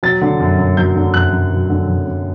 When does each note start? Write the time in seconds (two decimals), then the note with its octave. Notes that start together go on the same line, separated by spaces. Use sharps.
0.03 F#3 A6
0.22 D3
0.40 F#2
0.59 F#2
0.77 F#3 G6
0.95 D3
1.14 F#2 F#6
1.32 F#2
1.51 F#3
1.69 D3
1.88 F#2
2.07 F#2